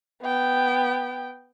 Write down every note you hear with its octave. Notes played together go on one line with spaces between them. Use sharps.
B3 G5